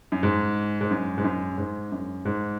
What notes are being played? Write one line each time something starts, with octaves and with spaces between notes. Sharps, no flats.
F#2
G#2
G#2
F#2
G#2
F#2
G#2
F#2
G#2